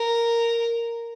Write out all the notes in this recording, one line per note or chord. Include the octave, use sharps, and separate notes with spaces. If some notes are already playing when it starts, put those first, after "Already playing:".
Already playing: A#4